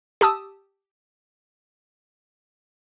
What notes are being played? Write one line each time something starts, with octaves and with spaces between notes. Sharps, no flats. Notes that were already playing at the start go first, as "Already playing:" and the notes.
G4 A5 D#6 E6